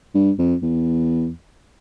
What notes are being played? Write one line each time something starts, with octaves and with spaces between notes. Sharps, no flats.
G2
F2
E2